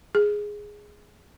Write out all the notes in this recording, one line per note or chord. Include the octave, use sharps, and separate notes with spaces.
G#4